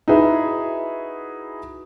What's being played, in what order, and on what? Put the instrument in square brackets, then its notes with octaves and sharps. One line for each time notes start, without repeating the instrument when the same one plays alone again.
[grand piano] D#4 E4 F#4 G#4 B4 E5